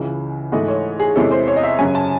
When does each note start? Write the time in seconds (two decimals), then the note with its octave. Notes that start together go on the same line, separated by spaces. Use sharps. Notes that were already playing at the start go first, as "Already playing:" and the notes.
Already playing: C#2 C#3 E3
0.52 G#2 E3 A3 D#5
0.68 C#5
1.00 G#4
1.16 E2 C3 E3 G#3 C#4 A4
1.32 C5
1.48 C#5
1.56 D#5
1.63 E5
1.79 F#2 C#3 F#3 G#5
1.95 A5